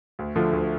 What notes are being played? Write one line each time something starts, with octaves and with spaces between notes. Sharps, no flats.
D2
D3 F3 A3
D2